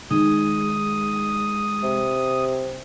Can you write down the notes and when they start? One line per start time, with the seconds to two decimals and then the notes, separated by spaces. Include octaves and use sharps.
0.11 D#3 G#3 D#6
1.83 C3